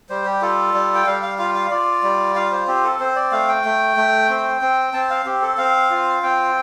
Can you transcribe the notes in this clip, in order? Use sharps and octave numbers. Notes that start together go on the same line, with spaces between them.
G3 C5
G4
F4 A4
G3
G5
G3 F5
F5
F4 F5
F5
F4 D5
G3
F4 F5
C5
C4 G4
A4
C4 C5
D5
A3 F5
G5
A3
A3
C4
C4
C4 A5
F5
C4 G4
A4
C4 F5
F4
C4 G5